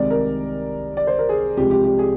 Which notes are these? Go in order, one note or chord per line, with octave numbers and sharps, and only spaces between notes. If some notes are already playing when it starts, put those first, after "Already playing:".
Already playing: C2 C3 D#3 G#3 D5
A#4
D5
C5
A#4
G#4
C2 C3 F3 G#3 G4
G4
G4
G#4